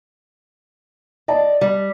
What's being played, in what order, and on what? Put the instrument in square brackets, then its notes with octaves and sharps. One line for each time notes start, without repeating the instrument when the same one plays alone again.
[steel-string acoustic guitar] D5 [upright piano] D#5 A5
[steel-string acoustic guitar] G3